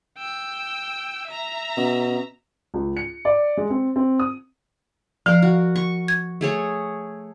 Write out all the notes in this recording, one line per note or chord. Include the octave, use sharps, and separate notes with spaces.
G5 E6
E5 A#5
B2 C#4
C#2
C#7
D5
G#3
C4
C4
D#6
F3 A#4 F5
F#4
C#6
G#6
A3 G#4 C#5